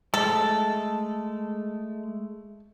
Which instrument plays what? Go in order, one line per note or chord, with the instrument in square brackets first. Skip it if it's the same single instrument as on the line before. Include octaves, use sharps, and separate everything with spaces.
[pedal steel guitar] G#3 A3 [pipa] A4